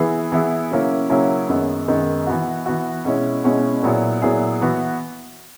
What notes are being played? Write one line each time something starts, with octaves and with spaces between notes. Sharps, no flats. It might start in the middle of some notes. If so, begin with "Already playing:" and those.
Already playing: E3 B3 E4 G#4
E3 B3 E4 G#4
C#3 F#3 A#3 C#4 E4
C#3 F#3 A#3 C#4 E4
F#2 D#3 G#3 B3
F#2 D#3 G#3 B3
E3 B3 F#4
E3 B3 F#4
B2 G#3 C#4 E4
B2 G#3 C#4 E4
A#2 F#3 B3 E4 G#4
A#2 F#3 B3 E4 G#4
E3 B3 F#4